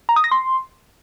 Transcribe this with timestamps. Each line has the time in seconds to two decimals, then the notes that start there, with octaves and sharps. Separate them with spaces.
0.09 A#5
0.16 D#6
0.24 A#6
0.32 C6